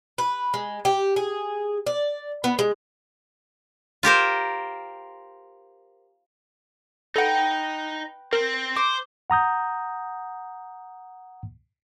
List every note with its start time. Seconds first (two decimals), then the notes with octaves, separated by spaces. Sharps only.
0.18 B4
0.54 G#3
0.85 G4
1.16 G#4
1.86 D5
2.44 B3
2.59 G#3
4.03 F4 G4 A#4 C5
7.16 D#4 A4 B4 F#5 G5
8.33 C4 A#4
8.76 C5 D6
9.30 F#5 A#5 D#6 G6